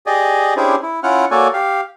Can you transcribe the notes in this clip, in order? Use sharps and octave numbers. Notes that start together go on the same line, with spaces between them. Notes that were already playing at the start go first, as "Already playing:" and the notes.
G4 G#4 D5 D#5
C#4 D4 E4 G4 G#4 C5
E4
C#4 E4 F4 F#5 F6
A#3 F#4 A4 C#5 D5 G#5
G4 F5